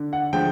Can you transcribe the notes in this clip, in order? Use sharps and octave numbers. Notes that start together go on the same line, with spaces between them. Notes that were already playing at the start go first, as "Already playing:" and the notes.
Already playing: D3
F#5
D3 F3 G#3 G5